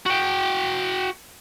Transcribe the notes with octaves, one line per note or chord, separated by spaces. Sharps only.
F#4 G5